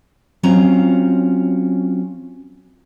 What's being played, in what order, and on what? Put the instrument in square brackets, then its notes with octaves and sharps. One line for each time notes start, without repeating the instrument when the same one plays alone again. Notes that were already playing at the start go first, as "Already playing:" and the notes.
[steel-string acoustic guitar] F#3 C4 C#4 F4 A#5